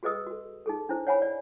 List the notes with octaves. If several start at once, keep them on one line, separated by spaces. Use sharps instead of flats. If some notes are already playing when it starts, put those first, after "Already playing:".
F#4 G#4 B4 D#5 D#6 E6
F#4 A4
D#4 G#4 A4
D4 E4 C5
C#5 F#5 G#5 B5
D5